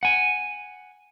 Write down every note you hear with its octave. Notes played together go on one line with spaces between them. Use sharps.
F#5 G#5